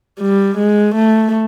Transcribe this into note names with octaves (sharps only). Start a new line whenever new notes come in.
G3
G#3
A3